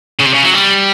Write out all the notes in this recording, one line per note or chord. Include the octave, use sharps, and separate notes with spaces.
C#3
C3
C#3
F#3
G3